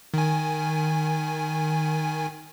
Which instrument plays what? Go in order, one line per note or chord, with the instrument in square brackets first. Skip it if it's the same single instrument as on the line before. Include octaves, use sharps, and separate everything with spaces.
[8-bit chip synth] D#3 G#5